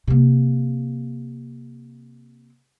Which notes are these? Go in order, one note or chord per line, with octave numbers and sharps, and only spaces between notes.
C3 A#3